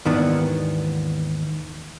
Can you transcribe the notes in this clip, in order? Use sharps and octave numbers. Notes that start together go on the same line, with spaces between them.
D#2 G#2 D#3 E3 B3 D4